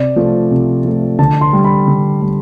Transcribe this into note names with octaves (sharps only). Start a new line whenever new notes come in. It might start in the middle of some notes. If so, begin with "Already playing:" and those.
Already playing: C3 D5
F3 A3
C3
F3 A3
D3 A5
C6
G3
B5
D3
G3